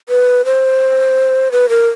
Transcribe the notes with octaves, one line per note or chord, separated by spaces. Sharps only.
B4
C5
B4
A#4